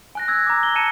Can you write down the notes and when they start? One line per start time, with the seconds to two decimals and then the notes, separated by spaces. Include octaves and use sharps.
0.15 G#5 F#6 A#6
0.28 E6 F#6 G#6
0.47 A#5 D6
0.63 G7
0.76 A5 C#7 D#7 E7